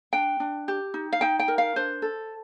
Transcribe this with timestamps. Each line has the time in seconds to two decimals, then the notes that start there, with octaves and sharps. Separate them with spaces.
0.13 D4 G5
0.40 D4
0.68 G4
0.94 D#4
1.12 F5
1.21 D#4 G5
1.39 G5
1.48 A#4
1.58 F5
1.76 D4 C5
2.02 A4